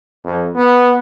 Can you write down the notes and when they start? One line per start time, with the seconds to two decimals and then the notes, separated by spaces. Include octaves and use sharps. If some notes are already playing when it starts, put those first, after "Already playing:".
0.24 F2
0.55 B3